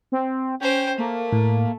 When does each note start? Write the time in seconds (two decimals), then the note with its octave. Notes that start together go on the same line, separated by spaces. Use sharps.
0.12 C4
0.61 C#4 C5 G5
0.98 A3 A#3
1.32 A2